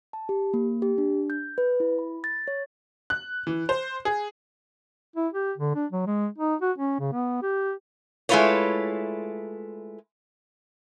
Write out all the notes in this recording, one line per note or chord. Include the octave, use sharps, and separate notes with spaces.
A5
G4
A#3
G4
D4
G6
B4
E4
B5
A6
C#5
F#6
E3
C5
G#4
E4
G4
D3
D4
F#3
G#3
D#4
F#4
C#4
C#3
B3
G4
G#3 A3 E4 F4 B4 C#5